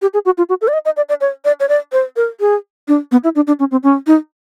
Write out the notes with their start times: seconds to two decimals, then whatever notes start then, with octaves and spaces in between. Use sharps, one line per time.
0.02 G4
0.14 G#4
0.25 F#4
0.38 F4
0.49 F#4
0.61 A4
0.68 D5
0.73 D#5
0.85 D#5
0.97 D5
1.09 D5
1.21 C#5
1.45 D5
1.60 C#5
1.69 D5
1.92 C5
2.16 A#4
2.40 G#4
2.88 D4
3.12 B3
3.24 E4
3.35 D4
3.47 D4
3.59 C#4
3.71 C4
3.83 C#4
4.07 D#4